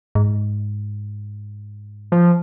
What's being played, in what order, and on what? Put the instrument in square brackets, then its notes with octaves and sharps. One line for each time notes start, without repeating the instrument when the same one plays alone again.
[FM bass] G#2
[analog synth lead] F3